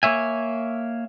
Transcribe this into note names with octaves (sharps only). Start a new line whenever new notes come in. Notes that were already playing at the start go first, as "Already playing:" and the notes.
A#3 C#5 E5 G#5